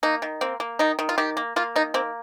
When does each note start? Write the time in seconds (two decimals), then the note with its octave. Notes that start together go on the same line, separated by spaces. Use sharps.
0.03 A#3 D#4
0.22 D#3
0.41 A#3 C4
0.60 A#3
0.79 D#3 D#4
0.99 D#3
1.09 F4
1.18 D#3 G4
1.37 A#3
1.56 A#3 F4
1.76 D#3 D#4
1.94 A#3 C4